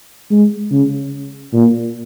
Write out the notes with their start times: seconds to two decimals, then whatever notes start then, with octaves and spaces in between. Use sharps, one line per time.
0.31 G#3
0.71 C#3
1.53 A#2